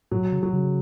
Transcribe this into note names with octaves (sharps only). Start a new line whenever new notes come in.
A2 F#3
C#3
F#3
C#3